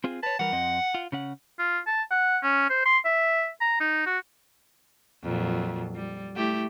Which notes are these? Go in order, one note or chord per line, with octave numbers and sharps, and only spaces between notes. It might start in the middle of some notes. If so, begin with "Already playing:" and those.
C4 F4 G#4
B4 C#5 A5
E3 G3 A#4 F#5
F2 C4 D#5
F4
C#3 C#4 F#5
F4
A5
F#5
C#4
C5
C6
E5
A#5
D#4
F#4
F2 A#2 F#3
G3
A3 E4 G4